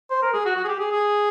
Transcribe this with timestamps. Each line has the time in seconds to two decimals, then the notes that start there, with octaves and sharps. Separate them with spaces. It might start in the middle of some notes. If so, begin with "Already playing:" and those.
0.11 C5
0.22 A#4
0.33 G#4
0.45 F#4
0.56 F#4
0.64 G#4
0.68 G4
0.80 G#4
0.91 G#4